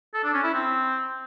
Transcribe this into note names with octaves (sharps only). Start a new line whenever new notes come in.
A4
D4
C#4
E4
C4